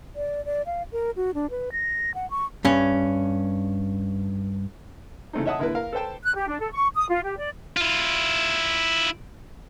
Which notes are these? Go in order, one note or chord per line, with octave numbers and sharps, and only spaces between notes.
D5
D5
F5
A#4
F#4
D4
B4
A#6
F#5
C#6
G2 C#4
C#3 E3 A3 C4 D#4
C#5 D#5 E5 F#5 A5 D#6
D3 A#3 E4 A#4 B4
A#4 F5
A4 B4 C5 G5 A5
F#6
G4
D4
A4
C#6
D#6
F4
G4
D5
E4 F4